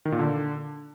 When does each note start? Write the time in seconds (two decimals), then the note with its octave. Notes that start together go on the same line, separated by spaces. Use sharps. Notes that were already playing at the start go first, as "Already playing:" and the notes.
0.05 D#3
0.12 A#2
0.19 D3